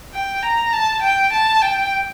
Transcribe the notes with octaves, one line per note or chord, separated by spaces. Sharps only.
G5
A#5
A5
G5
A5
G5